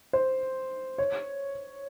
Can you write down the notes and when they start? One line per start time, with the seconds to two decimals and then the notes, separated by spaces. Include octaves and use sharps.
0.13 C5
0.98 C#5